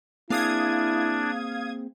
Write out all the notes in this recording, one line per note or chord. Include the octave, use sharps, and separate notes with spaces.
A#3 C4 D4 E4 G#4 F5 D#6 G#6